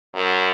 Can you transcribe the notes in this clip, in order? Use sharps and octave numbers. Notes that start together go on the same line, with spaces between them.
F#2